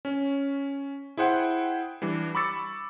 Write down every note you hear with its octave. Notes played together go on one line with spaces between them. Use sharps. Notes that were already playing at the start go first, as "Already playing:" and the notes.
C#4
E4 G#4 C5 F#5 G5
E3 G3 D4
B5 C#6 D6 E6 A6 C#7